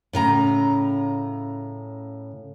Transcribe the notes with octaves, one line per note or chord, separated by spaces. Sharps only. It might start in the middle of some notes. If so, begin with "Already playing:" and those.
A2 C#3 A#5